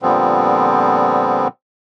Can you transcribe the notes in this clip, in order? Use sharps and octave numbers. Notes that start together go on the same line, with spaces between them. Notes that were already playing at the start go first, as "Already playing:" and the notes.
A#2 D3 F3 G3 B3 C4